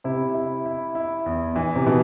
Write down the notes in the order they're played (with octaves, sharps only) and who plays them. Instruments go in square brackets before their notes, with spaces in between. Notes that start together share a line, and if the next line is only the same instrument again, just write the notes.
[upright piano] C3 [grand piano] E4
[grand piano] E4
E4
E4
E2
E3
[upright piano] C3
[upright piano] B2 [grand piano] E3